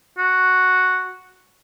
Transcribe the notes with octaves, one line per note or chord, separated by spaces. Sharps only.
F#4